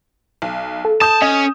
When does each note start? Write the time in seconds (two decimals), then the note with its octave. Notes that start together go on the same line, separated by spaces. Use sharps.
0.42 B1
0.85 A4
1.01 A5 D#6 G6 E7
1.22 C#4 D#5